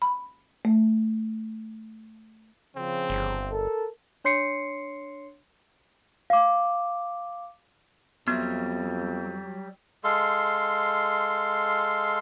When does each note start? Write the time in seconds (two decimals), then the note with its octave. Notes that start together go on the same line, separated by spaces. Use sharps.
0.02 B5
0.65 A3
2.76 C#3 F3 C4
3.10 G1
3.52 A4 A#4
4.25 D4 C#5 C6 C7 C#7
6.30 F5 D6
8.28 F2 F#3 G3 B3
10.04 G#3 A4 F5 C6